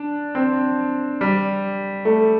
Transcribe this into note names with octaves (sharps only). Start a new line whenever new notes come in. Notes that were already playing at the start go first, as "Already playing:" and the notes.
Already playing: D4
C4
G3
A3